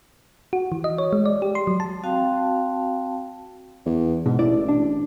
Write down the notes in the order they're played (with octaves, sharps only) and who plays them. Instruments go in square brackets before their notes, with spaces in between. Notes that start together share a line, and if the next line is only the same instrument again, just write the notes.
[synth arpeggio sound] F#4
E3
D#5
C#5
G#3
D5
G4
C6
F#3
A5
[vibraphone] C4 F#4 F5 G5 A5
[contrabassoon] E2
[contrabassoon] G#2 [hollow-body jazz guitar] B2
[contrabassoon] A1 [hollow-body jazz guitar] E4 D5
[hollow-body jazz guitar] D4